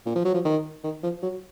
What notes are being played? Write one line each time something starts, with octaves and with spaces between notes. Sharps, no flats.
A#2
F3
F#3
F3
D#3
D#3
F3
F#3